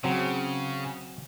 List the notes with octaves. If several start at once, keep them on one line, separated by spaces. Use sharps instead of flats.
C#3 F#3 C4